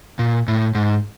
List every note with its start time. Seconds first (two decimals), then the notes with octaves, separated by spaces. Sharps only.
0.19 A#2
0.48 A2
0.75 G#2